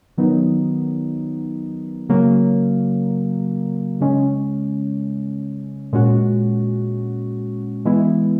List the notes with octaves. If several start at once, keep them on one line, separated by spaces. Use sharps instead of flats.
D#3 F#3 B3 D#4
C#3 F#3 A#3
C#3 G#3 C#4
A#2 G#3 C#4 F#4
E3 G#3 B3 E4